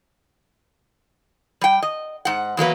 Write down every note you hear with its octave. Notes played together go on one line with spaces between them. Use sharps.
G3 G5
D#5
G#2 F#5
E2 F#3 A#3 B4